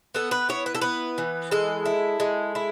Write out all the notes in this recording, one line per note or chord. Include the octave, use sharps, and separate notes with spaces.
B3 A4
B4
E4 C#5
B4
A4
B3 B4
E3
G#3 A4
E4
G#3
E4